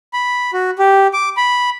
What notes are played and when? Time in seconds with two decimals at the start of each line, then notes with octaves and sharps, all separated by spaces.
0.13 B5
0.53 F#4
0.79 G4
1.13 D6
1.37 B5